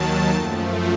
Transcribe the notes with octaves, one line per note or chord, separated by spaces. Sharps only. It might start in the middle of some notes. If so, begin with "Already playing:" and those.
Already playing: D#2 D#3 F#3 A5
F#2 F3 A3